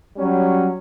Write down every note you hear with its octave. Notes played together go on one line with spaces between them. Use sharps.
F#3 G3 C#4